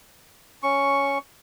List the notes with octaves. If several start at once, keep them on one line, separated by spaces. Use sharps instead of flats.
C#4 C#6